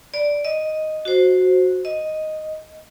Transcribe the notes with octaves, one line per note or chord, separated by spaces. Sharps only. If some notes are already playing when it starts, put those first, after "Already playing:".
D5
D#5
F#4 C5
D#5